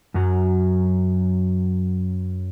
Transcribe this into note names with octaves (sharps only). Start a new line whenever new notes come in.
F#2 F#3